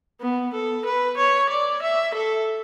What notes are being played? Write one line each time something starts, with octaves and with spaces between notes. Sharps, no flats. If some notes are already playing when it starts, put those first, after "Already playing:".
B3
A4
B4
C#5
D5
E5
A4